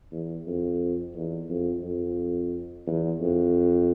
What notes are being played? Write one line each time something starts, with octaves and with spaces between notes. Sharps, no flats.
E2
F2
E2
F2
F2
E2
F2